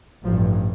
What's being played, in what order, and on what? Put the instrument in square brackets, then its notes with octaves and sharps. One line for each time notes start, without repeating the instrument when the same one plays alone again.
[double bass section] A1 G2 F3